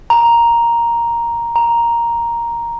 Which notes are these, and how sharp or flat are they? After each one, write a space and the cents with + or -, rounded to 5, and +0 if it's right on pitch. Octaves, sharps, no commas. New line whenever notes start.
A#5 +5
A#5 +5